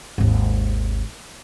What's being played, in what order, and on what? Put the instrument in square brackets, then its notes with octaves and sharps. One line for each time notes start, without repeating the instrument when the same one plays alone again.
[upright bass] G#1 D#2